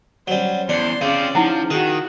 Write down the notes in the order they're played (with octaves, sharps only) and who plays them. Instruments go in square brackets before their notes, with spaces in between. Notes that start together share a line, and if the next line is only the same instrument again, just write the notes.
[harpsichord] F#3 G3 [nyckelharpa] C#4 C5
[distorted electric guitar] E2 [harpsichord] D4 [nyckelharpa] C6
[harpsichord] C#3 [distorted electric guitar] C4 F4 [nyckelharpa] C#4 D5
[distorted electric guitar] F3 [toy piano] D#4 E4 F#5
[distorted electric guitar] D#3 [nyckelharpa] F#4 [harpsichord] G#4